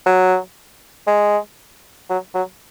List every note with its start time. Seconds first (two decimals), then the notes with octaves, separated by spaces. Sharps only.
0.06 F#3
1.07 G#3
2.10 F#3
2.35 F#3